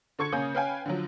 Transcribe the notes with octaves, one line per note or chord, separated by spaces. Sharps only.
D3 A4 C#6 G#6 C#7
C#3 A#3 C#4 G#5 D#6 G6
C#4 B4 F5 G5 G#5
D3 F3 F#3